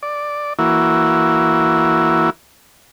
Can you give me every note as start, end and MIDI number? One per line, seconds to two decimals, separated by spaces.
0.03 0.53 74
0.59 2.30 52
0.59 2.30 58
0.59 2.30 64
0.59 2.30 66